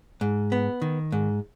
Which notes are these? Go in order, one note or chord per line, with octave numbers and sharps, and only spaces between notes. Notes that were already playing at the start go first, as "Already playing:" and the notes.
G#2
B3
D#3
G#2